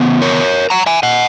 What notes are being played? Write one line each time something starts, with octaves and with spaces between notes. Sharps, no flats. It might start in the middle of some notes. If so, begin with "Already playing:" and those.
Already playing: C#3 E3 B3
A#4 C#5
F#5 A#5
E5 G#5
D#5 F#5